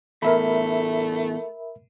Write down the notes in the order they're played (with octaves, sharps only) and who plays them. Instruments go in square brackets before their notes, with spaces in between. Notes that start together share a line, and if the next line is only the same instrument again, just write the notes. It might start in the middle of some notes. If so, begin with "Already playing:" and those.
[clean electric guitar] E2 A2 [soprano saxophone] A3 [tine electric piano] A#4 E5 B5